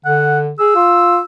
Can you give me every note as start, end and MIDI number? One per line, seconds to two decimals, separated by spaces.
0.05 0.51 50
0.05 0.39 78
0.59 0.74 68
0.59 1.24 88
0.75 1.18 65